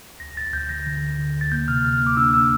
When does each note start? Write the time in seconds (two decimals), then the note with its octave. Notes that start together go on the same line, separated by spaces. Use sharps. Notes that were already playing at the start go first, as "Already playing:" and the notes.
0.20 D2 A#6
0.37 D2 A6
0.53 D2 G6
0.69 D3 A#6
0.86 D3
1.02 D2
1.19 D3
1.35 D2
1.41 A6
1.52 A#3 G6
1.68 C3 F6
1.85 C3 F6
2.01 A#3
2.06 D6
2.17 D4 E6
2.34 A#3 E6